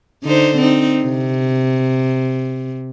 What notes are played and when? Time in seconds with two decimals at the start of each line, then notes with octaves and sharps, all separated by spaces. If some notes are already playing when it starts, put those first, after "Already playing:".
0.23 D3 D#4 C5
0.57 C4 D#4
1.03 C3